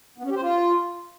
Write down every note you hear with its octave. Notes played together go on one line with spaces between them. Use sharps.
B3
C#4
G4
C5
F4